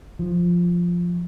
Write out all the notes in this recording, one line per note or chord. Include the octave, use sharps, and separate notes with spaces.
F3